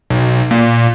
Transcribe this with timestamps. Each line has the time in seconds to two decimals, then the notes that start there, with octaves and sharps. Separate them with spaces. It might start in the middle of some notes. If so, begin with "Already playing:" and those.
0.10 B1
0.51 A#2